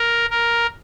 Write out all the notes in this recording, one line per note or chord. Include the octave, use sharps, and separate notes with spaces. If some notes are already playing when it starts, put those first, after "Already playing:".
Already playing: A#4
A#4